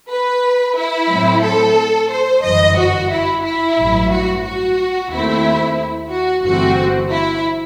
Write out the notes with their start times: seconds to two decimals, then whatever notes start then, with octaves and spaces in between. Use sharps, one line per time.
0.10 B4
0.76 E4
1.10 A2 F#3 C4
1.44 A4
2.10 C5
2.44 G1 F#2 E3 D#5
2.77 F#4
3.10 E4
3.44 E4
3.77 A1 G2 F#3
4.11 F#4
4.44 F#4
5.10 D#2 D#3 A3 C4 E4
6.10 F#4
6.43 G1 G2 E3 A3 C4 F#4
7.10 E4